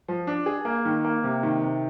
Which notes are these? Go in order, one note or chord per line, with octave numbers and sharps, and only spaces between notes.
F3
D4
G#4
A#3
D#3
A#3
C3
D#3
C3